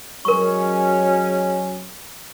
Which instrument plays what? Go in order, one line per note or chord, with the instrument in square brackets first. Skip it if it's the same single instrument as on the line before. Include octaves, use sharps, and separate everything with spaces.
[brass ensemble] F#3 G#3 C#4 [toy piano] A#4 C#6